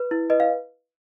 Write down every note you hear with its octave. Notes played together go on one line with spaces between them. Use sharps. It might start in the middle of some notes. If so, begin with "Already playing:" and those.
Already playing: B4
E4
B4 D#5
F5